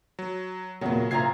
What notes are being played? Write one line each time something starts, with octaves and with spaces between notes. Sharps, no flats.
F#3
E2 A#2 C#3 F#3
A1 C3 F4 A#5 G#6 C7